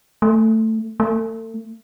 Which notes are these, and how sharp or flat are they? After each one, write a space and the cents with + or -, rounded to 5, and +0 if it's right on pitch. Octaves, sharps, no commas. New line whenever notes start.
A3 +10
A3 +35